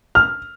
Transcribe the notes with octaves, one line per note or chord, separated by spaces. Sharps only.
F6